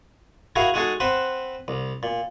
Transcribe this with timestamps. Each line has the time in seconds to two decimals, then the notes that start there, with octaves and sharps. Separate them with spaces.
0.56 E4 F#4 G#4 A#4 F5 F#5
0.74 G#3 D#4 F#4 G#4 A4
1.00 C4 B4 C5 F#5
1.68 C2
2.03 A#2